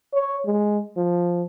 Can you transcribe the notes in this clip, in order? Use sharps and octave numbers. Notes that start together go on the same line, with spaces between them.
C#5
G#3
F3